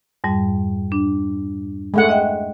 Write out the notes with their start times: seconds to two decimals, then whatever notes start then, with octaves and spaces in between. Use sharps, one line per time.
0.24 F2 G#2 G3
0.92 D4
1.94 G#3 A3 F#5
2.09 D#5 E5 G5